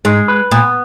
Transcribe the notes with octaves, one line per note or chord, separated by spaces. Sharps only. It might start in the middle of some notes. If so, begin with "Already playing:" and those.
G#2 G#3
B4
A#2 B3